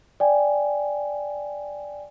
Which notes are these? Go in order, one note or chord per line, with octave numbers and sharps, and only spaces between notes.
D5 G5 G#5